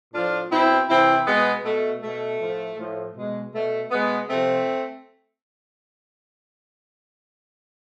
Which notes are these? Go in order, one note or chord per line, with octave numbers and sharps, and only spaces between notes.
A2 F3 D4 F4
B2 C4 E4
C3 E3 C4 E4
B2 G#3 B3
B2 A3
B2 A3
A2 F3
A2 F3
B2 G#3
B2 A3
B2 G#3 B3
C3 F3 A3 C4